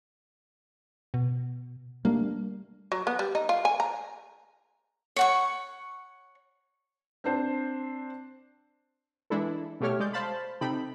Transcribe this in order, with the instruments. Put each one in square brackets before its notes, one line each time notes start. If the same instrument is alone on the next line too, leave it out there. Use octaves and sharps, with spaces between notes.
[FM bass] B2
[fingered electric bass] G3 A3 D4 [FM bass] A#3
[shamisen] F#3
B3
G3
D#4
F4
G#5
A#5
[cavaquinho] C#5 F#5 C#6
[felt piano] C4 D4 C5
[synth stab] E3 G#3 D4 E4 A4
B2 G3 A3 G4 C#5 F6
G#3 D5 G6
C5 F5 A5 B5
C3 D#4 A4 G5 B5